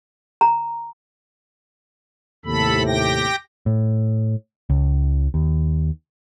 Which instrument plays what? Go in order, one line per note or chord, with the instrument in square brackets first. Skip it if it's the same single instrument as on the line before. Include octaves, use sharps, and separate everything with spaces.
[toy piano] A#5
[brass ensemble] D#2 A2 C3 [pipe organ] A4 B5
[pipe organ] G4 G5 A#6
[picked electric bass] A2
C#2
D#2